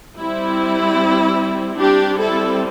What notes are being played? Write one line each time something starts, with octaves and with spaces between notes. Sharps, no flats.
G3 C4 E4
G3 C4 D4 G4
E4 A4